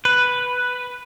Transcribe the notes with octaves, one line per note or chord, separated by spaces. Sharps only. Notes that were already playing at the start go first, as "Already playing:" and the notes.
B4